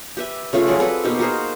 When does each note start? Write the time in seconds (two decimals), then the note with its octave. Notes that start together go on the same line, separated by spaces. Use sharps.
0.17 G4 B4 E5
0.53 C#3 A3 F4 B4
0.67 F#3 G3 G#4 D5
0.79 C4 G#4 A4 B4
1.04 B2 A#3 D#4 G4
1.19 F#4 G#4 A#4 C5